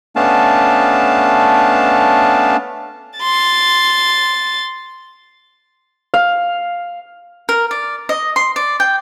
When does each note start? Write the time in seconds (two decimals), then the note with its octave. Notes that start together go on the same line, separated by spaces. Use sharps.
0.16 A3 B3 C#4 D4 F5 A5
3.19 C6 A6
6.14 F5
7.49 A#4
7.71 D5
8.09 D#5
8.36 C6
8.56 D5
8.80 G5